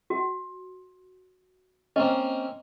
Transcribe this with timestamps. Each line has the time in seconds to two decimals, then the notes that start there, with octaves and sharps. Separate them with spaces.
0.10 F#4
1.96 A#3 C4 C#4 D#5